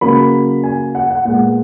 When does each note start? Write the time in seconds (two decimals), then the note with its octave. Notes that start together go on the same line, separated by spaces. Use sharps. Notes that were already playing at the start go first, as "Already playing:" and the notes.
0.01 C#3 F#3 A#3 B5
0.64 G#5
0.95 F#5
1.11 F#5
1.25 A#2 G#3 B3 F#5